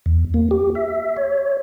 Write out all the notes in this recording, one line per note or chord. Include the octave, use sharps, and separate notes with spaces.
E2
A#3
G4
E5
C#5